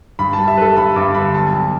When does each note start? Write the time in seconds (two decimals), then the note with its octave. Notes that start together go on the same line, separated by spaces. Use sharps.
0.19 G2 B5
0.33 G3 A5
0.48 E5
0.57 G3 B4
0.62 A4
0.77 G2 B5
0.96 G2 D6
1.15 D3 B5
1.34 B1 A5
1.53 B1